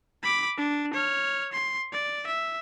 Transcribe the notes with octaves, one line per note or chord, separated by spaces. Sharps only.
B5 D6
D4
C#5 F6
C6
D5
E5